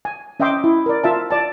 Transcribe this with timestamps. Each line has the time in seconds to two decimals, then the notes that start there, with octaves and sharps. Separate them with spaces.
0.05 G#5
0.40 C#4 D#5 E5 G5 C6 D6
0.64 E4
0.86 A#4 D5
1.04 F4 E5 A5
1.31 D5 A5